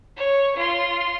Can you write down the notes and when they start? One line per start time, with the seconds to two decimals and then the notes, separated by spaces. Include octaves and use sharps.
0.17 C#5
0.56 F4 C6